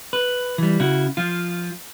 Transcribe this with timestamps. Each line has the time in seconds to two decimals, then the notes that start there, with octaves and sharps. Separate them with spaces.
0.13 B4
0.58 E3 G3
0.80 C#3 E4 F#4
1.17 F3 F4